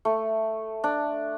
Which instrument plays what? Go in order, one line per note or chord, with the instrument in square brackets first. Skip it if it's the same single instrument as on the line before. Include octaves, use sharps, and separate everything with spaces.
[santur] A3
D4